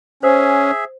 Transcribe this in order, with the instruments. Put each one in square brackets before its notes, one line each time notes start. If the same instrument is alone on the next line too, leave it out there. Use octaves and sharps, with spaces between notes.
[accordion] C#4 [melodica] G#4 E5 [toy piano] C5